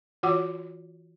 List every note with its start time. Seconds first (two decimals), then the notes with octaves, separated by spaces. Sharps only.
0.23 E3 F4 F#4 C#5 F#5 D6